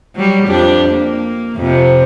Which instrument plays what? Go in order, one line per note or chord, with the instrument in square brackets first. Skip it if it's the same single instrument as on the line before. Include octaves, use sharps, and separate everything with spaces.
[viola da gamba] F#3 G3
F2 D4 G4
A#3
F2 C3